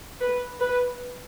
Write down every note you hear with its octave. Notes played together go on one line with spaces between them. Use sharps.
B4
B4